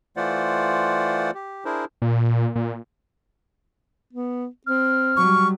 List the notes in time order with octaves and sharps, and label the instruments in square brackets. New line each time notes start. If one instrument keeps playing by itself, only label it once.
[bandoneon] E3 A3 F4 C5 D5 F#5
G4
D4 E4 G#4 A#4 C5
[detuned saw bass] A#2
A#2
[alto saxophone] B3
[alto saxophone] C4 [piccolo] F6
[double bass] F#3 G3 [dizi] C#6